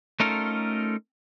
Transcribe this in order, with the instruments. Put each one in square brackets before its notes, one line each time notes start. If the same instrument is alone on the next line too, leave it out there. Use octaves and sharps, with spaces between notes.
[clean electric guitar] A3 C#4 D#4 F4 A4 A#4